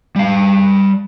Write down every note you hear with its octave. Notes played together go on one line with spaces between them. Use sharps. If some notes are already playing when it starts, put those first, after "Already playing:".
G3 F5